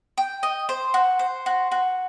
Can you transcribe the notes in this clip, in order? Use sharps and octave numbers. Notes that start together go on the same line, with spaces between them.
G5
D#5
C5
F#4
C5
F#4
F#4